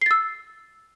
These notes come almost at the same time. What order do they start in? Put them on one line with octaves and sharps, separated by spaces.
C7 A6 E6